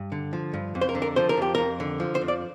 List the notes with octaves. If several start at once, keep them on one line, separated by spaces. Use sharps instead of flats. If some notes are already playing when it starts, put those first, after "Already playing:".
Already playing: G2
D3
F3
G2
F2
C5
A#4
D3
A#4
F3 C5
A#4
F2 G4
F2 A#4
D3
F3
C5
F2
D5